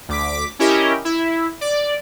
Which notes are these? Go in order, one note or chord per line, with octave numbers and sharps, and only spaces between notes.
D2 D6 B6
C#4 E4 G4 A#4 D#5
E4
D5